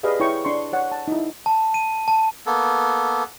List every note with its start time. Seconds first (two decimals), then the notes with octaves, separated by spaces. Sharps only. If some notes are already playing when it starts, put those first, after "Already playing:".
0.03 G4 G#4 B4 D5 D#5 F5
0.20 E4 C#5 G5 C#6
0.45 D4 C6 C#6
0.73 C#5 F#5
0.92 A5
1.08 D#4 E4
1.46 A5
1.74 D#7
2.08 A5
2.46 A#3 B3 A4